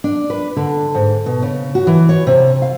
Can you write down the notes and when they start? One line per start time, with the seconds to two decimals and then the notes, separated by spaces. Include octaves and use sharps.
0.04 D4
0.30 B4
0.57 D3
0.95 G#2
1.26 B2
1.42 C#3
1.75 F#4
1.87 E3
2.09 C#5
2.27 C3
2.62 F5